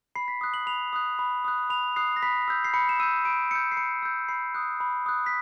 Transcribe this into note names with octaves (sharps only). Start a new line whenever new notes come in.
B5 C7
B6
D#6 F#6
F#7
B5 F7
D#6 F#6
B5
D#6 F#6
B5 F7
D#6 F#6 C7
A#6
B5 B6
E6 G6
C7
B5 C#7
E7
E6 G6 D#7
B5 D7
E6 G6 C#7
C7
B5 C#7
E6 G6
B5 C7
D#6 F#6
B5
D#6 F#6
B6